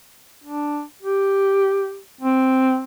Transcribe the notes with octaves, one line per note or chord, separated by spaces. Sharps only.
D4
G4
C4